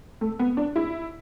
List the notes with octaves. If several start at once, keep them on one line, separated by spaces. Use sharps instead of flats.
A3
B3
D4
E4